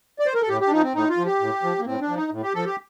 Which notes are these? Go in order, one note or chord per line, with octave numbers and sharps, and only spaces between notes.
D5
C5
A#4
A4
A2 G4
G4
D4
F3 D#4
C4
A2 D#4
F4
F3
G4
A2
F3
A#3
A2 C4
D4
F3
D#4
A2
G4
F3 A4
G4